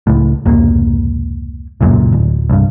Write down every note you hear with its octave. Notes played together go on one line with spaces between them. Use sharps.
C#2 A2
F1 C#2 G#2 A#3
E1 C#2 F#2 A#2
D1
C2 G2